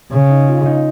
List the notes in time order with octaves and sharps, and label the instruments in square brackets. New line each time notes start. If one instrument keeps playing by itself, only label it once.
[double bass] C#3
[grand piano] D#4
F4
D#4